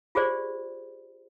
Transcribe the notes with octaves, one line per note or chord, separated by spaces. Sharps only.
F4 G4 G#4 C5 D5